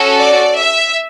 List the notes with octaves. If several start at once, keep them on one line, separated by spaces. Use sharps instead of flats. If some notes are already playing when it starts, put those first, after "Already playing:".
Already playing: C#4 F#4 A4
D5
E5